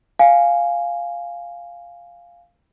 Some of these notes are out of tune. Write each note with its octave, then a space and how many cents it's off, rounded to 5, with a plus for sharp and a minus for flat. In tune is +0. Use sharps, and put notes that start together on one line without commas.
F5 +0 G#5 +0